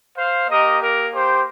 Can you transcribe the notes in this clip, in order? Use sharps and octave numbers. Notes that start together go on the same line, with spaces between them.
C5 F5
A#3 G4 A#4 D#5
A#4
G4 C5